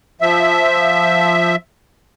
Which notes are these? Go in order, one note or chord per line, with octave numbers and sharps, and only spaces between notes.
F3 E5